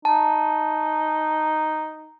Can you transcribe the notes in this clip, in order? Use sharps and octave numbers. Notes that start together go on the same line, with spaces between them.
D#4 A5